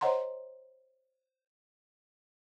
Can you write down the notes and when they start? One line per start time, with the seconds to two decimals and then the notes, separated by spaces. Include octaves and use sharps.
0.01 C5 C#5 D#5 F#5 A#5 C6